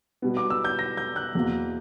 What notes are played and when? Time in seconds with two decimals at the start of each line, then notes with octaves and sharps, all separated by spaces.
0.22 B2 G3 B3
0.37 D6
0.50 E6
0.65 G6
0.79 A#6
0.97 G6
1.16 F#6
1.35 E2 B2 A#3